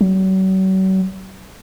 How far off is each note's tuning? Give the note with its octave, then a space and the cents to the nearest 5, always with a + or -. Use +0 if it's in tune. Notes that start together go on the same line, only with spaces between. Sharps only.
F#3 +40